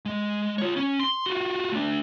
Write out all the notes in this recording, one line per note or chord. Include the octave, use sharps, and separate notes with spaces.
G#3
F4 C#5
C#4
C6
F4 F#4
A3 D4